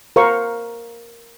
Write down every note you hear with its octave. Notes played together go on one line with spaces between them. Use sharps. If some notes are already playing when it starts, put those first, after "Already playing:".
A#4 C5 F5 C#6